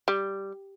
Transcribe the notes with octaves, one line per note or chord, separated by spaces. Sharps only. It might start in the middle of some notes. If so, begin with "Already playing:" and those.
G3